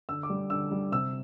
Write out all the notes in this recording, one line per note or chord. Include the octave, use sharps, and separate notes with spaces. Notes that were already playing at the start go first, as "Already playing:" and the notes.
D3 E6
D6
G3
D3 E6
G3
C3 E6